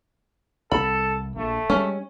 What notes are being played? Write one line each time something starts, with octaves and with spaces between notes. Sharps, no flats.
C2 A4 B5
A#1 A3
G3 G#3 C#4